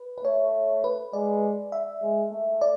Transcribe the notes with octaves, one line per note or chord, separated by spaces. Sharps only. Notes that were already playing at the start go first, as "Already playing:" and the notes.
Already playing: B4
B4
A3 C#5
B4
G#3 D5
E5
G#3
A3
D5